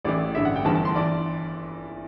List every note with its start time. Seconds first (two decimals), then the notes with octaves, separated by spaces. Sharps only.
0.05 A1 A2 E3 D5
0.35 A1 G2 D3 E5
0.45 F#5
0.56 G5
0.65 G1 G2 E3 A5
0.75 A5
0.85 C6
0.96 E3 D5